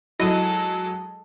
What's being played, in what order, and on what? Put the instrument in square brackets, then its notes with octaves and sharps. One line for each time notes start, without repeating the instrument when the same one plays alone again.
[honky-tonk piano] F#3 D#7 [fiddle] G#3 A4 [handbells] E4 [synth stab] D#5